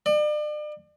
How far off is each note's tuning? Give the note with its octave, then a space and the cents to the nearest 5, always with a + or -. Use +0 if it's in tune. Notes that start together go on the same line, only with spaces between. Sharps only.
D5 +40